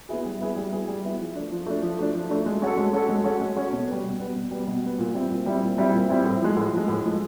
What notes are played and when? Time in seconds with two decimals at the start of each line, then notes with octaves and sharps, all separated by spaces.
0.09 B3 E4 G#4
0.25 G3
0.41 B3 E4 G#4
0.56 G3
0.72 B3 E4 G#4
0.88 G3
1.04 B3 E4 G#4
1.20 F3
1.35 A3 D4
1.52 F3
1.67 A3 D4
1.82 F3
1.99 A3 D4
2.14 F3
2.30 A3 D4
2.46 G#3
2.62 C#4 F#4 A4
2.77 G#3
2.93 C#4 F#4 A4
3.09 G#3
3.24 C#4 F#4 A4
3.40 G#3
3.56 C#4 F#4 A4
3.73 B2
3.88 G3 B3
4.03 B2
4.20 G3 B3
4.35 B2
4.51 G3 B3
4.67 B2
4.83 G3 B3
4.99 A#2
5.14 G3 C4 E4
5.30 A#2
5.46 G3 C4 E4
5.62 A#2
5.78 G3 C4 E4
5.93 A#2
6.09 G3 C4 E4
6.25 A2
6.41 F3 G#3
6.56 A2
6.72 F3 G#3
6.88 A2
7.04 F3 G#3